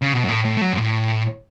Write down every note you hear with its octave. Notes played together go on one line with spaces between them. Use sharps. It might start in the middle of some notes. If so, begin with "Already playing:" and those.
C#3
B2
F#2
A2
A2
A3
F#3
F#2
A2